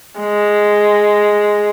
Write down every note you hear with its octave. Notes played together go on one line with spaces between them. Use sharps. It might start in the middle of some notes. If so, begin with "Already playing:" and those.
G#3